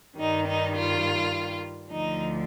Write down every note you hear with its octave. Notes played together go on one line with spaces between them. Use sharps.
G2 D#3 G3 D#4
D#4
F4
D2 D3 F3 D#4